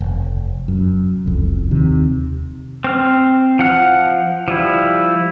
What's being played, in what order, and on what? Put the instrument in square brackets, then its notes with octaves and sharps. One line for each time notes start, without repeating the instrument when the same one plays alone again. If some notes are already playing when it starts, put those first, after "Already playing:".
[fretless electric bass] F1
F#2
E1 C2 F2
D#2 C3 D#3
[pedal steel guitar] C4 F6
F3 F#5 F6
F3 G3 E4